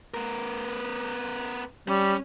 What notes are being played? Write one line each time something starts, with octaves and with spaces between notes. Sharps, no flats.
B3 A#4
G3 C#4